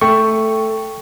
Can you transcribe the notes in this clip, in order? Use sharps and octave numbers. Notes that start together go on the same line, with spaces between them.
A3 G5 C#6